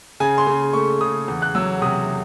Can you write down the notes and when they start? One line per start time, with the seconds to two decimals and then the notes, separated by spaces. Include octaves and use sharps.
0.20 C#3 G#5
0.38 C6
0.47 C#3
0.73 A3 C#6
1.01 C#3 D#6
1.28 E2
1.42 F#6
1.55 F#3 E6
1.82 C3 D#6